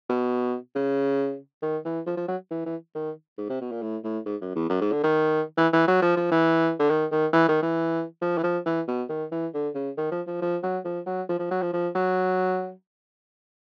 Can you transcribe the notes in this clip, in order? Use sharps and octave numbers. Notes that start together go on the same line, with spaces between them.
B2
C#3
D#3
E3
F3
F3
F#3
E3
E3
D#3
G#2
C3
B2
A#2
A2
A2
G#2
F#2
E2
F#2
G#2
D3
D#3
E3
E3
F#3
F3
F3
E3
D3
D#3
D#3
E3
D#3
E3
F3
E3
F3
E3
B2
D#3
E3
D3
C#3
D#3
F3
F3
F3
F#3
F3
F#3
F3
F3
F#3
F3
F3
F#3